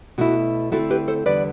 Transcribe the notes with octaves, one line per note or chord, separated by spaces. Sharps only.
B2 A3 E4 F#4
D3 A3 C4 E4 F#4 A4
G4 B4
A4 C5
E2 D3 G3 B3 B4 D5